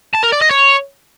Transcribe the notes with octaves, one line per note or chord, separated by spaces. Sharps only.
A5
A#4
D5
D#5
C#5